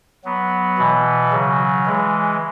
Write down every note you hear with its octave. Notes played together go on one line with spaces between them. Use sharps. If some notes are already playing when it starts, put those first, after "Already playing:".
F#3 B3
B2 E3
C#3 F#3
E3 G#3